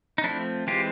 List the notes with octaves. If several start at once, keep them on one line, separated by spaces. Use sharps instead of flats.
D#4
F3 A3 C4 D4 E4
E3 G#3 C4 F4 G4